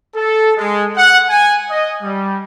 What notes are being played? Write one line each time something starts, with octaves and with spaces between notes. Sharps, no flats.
A4
G#3
F#5
G#5
D#5
G3